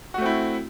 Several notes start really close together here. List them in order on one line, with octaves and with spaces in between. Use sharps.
F#4 A3 C4 E4